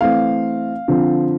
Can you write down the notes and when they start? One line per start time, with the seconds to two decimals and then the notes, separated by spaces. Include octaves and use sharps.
0.01 E3 A3 C4 F5
0.88 D3 F3 C4